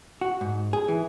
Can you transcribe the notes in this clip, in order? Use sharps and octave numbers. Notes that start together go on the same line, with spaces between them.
F#4
G#2
G#4
E3